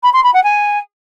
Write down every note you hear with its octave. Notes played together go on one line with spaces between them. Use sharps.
B5
C6
B5
F#5
G#5